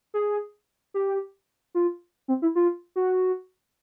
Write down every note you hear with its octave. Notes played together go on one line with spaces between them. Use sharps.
G#4
G4
F4
C4
E4
F4
F#4